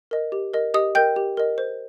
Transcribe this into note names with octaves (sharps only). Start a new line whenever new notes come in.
A#4 D#5
G4
A#4 D#5
G4 D#5 D#6
A#4 D#5 G5 G6
G4
A#4 D#5
C5